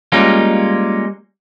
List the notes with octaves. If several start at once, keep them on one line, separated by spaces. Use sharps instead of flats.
G3 G#3 A#3 C#4 F4